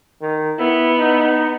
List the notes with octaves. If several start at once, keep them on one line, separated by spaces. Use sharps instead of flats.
D#3
B3 E4
D#4